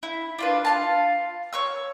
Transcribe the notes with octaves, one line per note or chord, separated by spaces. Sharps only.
E4
D4 F4 B4
F4 F5 A5
C#5 C#6 E6